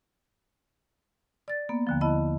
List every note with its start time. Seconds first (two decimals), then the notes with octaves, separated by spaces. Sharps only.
1.48 D5 A6
1.69 A#3 B3
1.87 D#2 D3 F3
2.01 E4 D#5 A5 B5